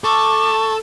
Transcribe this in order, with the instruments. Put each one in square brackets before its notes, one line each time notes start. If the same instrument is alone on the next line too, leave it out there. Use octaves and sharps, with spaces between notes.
[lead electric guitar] A4 [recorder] A5 [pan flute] C#6 [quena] D6